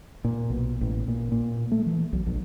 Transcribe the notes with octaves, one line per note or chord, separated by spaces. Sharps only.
A#2
B1
A1
A#2
A#2
A3
E3
B1
A#1